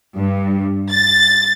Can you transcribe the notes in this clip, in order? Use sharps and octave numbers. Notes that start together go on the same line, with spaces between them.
G2
A6